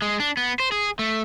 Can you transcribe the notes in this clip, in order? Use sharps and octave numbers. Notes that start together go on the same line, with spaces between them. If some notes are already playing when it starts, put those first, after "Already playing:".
G#3
D4
B3
C5
G#4
A3